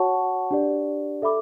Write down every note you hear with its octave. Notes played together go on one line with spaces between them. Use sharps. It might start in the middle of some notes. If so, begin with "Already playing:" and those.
Already playing: F#4 C#5 F#5 A5 C#6
D4 G4 D5
A4 E5 B5 D6